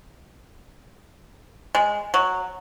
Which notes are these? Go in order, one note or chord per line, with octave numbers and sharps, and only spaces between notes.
G#3
F#3